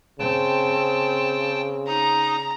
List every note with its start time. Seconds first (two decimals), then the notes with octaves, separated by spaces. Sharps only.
0.19 C#3 C4 G5 A5
1.88 D#4 A#5 D#6